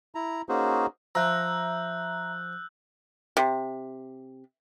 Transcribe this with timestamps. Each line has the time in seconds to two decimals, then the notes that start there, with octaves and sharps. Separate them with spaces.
0.15 E4 A#5
0.49 A#3 C#4 D#4 F#4 G#4 C5
1.15 F3 E5 A#5 E6 F#6 G6
3.37 C3